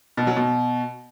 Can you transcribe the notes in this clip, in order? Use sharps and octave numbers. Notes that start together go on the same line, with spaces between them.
B2
F#3
B2